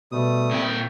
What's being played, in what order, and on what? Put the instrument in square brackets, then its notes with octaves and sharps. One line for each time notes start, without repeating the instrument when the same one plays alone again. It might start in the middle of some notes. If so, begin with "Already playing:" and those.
[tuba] B2 [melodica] G3 A3 D#6
[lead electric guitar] A#2 G5 [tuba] C4